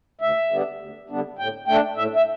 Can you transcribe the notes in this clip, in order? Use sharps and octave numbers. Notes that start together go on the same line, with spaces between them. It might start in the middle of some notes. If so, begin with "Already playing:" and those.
D2 E5
D3 G3 B3 D4
D2
D3 G3 B3 D4
A2 G5
A3 D4 G5
A2 E5
E5